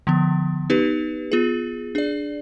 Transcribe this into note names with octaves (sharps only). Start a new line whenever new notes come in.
D3 F3 B3
B3 D#4 G4 B4
B3 F4 G#4
D4 G#4 D5